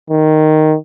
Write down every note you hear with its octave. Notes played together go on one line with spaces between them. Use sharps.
D#3